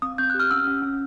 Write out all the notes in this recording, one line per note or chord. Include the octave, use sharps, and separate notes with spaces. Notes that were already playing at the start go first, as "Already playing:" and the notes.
C4 D#6
C4 G6
G4 F#6
F6
C#4 E6
C#4
C#4